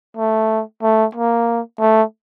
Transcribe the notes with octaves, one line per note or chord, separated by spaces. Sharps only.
A3
A3
A#3
A3